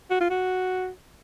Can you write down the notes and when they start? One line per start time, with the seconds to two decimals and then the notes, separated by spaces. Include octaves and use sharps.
0.10 F#4
0.20 F4
0.30 F#4